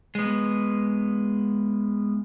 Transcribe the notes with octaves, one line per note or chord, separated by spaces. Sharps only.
G#3 B3